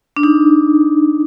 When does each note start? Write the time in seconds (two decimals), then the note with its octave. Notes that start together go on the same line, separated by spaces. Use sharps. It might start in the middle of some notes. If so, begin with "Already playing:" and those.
0.17 D4
0.23 D#4